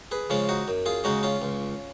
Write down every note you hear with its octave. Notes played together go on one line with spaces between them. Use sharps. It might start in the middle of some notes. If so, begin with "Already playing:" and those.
G#4 B4
C#3 F3 G#3 C#4 F4
D#4 F#4
F#2
F4 G#4
C#3 G#3 C#4 D#4 F#4
C#4 F4
C#2